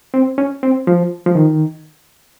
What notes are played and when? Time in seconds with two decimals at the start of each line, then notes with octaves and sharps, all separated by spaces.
0.14 C4
0.38 C#4
0.63 C4
0.87 F3
1.26 F3
1.35 D#3